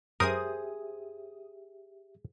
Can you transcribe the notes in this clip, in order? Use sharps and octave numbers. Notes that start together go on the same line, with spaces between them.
F#2 G4 G#4 A#4 C5 E5 D#6